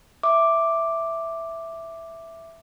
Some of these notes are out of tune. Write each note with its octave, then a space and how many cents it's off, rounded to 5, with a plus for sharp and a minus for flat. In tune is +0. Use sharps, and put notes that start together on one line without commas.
E5 +0 D6 +0